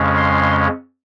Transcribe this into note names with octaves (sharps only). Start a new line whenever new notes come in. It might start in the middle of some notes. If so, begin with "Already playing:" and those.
Already playing: F2 C#3 G#3 C#4
C6